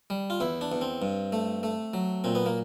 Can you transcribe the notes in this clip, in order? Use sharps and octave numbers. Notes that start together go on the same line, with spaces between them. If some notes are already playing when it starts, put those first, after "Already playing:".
G3
F4
E2 E4
D4
E2
C4
G2
A3
A3
F#3
A#2 C4
B3
A#3